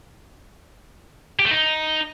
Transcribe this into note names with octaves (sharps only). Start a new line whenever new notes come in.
G4
A3
D#4